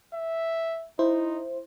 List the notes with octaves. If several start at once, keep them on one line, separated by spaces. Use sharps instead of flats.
E5
D#4 E4 C5